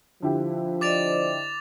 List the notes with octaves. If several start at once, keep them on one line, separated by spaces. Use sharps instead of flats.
D3 F3 E4 G4
C5 D5 D#5 D6 A6 F7